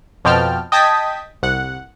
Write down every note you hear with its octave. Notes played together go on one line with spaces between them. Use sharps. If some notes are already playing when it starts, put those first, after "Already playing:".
F2 B2 F3 G5 A5 F6
D#5 G5 A5 D#6 G#6 B6
C2 F#5